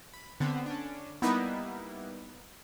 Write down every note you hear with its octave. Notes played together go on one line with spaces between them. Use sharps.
B5
D3 B3 C4
C#4 D4
G3 A#3 B3 D#4 E4 B4